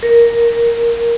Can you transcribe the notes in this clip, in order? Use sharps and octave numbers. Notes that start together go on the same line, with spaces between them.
A#4